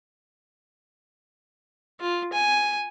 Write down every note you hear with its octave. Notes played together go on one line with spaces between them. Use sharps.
F4
G#5